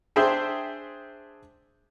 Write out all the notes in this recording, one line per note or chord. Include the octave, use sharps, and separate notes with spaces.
D4 G#4 C5 E5 G5